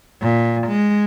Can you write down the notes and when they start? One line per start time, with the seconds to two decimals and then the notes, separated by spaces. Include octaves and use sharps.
0.21 A#2
0.66 G#3